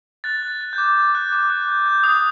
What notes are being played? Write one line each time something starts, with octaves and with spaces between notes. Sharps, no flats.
F#6 A6
F#6
A6
F#6
G6
D6
D6
F#6
D6
F#6
G6
G6
D#6